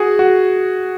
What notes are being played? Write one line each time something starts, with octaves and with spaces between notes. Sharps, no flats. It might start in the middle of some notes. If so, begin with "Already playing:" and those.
Already playing: F#4 G#4
F#4